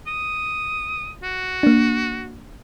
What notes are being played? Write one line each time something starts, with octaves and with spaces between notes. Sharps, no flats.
D#6
F#4
A#3 D4